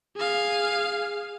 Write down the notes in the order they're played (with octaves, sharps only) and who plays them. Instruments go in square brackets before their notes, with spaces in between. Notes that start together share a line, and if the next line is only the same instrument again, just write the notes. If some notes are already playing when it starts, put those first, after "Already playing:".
[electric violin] G#4 F5